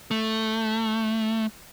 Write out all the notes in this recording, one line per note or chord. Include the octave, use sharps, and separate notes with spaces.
A3